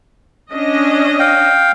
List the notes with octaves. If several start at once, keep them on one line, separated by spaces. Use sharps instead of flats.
C#4 D4 D#5
F5 G5